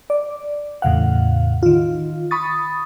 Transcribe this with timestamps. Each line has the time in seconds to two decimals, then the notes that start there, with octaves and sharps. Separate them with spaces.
0.10 D5
0.82 E2 A2 C#3 F5 F#5
1.63 D#3 F4
2.31 B5 C#6 D#6 A6